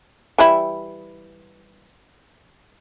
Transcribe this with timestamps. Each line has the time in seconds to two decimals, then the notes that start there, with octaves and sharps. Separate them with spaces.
0.38 E3 G3 E4